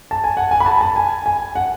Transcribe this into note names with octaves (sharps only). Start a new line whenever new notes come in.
A5
G#5
F#5
G#5
B5
A5
A5
G#5
G#5
F#5